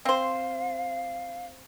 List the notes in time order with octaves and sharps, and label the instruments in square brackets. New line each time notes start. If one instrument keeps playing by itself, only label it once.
[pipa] C4 C5 [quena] F5